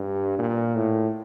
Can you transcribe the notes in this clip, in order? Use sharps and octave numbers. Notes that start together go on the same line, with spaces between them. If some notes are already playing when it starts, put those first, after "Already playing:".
Already playing: G2
A#2
A2